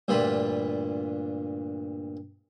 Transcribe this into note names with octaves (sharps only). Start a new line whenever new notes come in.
D2 G2 A#2 F4 B5